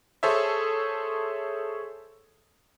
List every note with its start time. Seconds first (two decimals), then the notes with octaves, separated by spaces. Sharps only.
0.23 G#4 A4 C5 C#5 E5